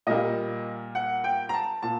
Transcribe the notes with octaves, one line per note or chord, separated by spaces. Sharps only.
A#2 G3 A#3 D#5
F#5
G5
A#5
A5
A#2 A5